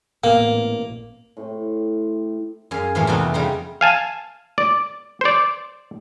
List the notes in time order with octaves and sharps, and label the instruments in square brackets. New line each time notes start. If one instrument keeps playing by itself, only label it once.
[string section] A1 [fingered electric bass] A#2 B3 [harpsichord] A#3 [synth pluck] F5
[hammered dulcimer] A2 C3 C4
[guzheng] F#2 G#4 F5
A2 E3 F3 A#3
F2 C3 E3 A3 B3 D4
C#3 G3 D#4 A#5 C6
[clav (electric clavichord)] F5 G#5 A5
D5
C5 D5